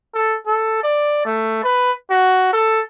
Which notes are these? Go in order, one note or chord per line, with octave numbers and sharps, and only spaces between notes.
A4
A4
D5
A3
B4
F#4
A4